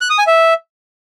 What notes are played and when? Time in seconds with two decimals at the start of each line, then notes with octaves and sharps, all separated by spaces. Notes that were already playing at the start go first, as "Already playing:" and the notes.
0.01 F#6
0.10 D#6
0.18 G#5
0.27 E5